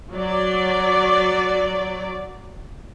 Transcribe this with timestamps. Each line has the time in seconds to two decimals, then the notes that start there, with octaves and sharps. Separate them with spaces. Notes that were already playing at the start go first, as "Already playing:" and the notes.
0.12 F#3 D5